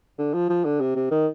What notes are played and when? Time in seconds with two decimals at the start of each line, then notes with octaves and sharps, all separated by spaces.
0.18 D3
0.34 F3
0.49 F3
0.65 D3
0.80 C3
0.96 C3
1.11 D#3